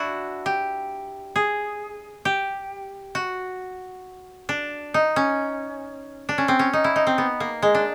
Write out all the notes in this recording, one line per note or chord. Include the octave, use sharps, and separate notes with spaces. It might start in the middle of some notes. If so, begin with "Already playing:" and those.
Already playing: D4 E4 F#4
G4
G#4
G4
F#4
D4
D#4
C#4
D4
C#4
C4
C#4
D#4
E4
D#4
C4
B3
A#3
G#3
D4